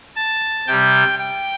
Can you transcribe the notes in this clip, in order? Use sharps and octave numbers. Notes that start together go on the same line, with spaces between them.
A5
C3 G3 G5
G5